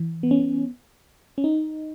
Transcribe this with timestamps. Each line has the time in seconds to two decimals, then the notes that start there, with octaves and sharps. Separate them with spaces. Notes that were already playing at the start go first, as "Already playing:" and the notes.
Already playing: E3
0.23 B3
0.31 C#4
0.39 B3
1.38 C#4
1.44 D#4